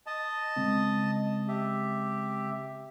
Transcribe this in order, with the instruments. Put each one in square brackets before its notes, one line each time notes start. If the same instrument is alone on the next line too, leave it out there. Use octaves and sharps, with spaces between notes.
[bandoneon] D#5 A5
[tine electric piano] C#3 G#3 C4
[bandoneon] G4 E5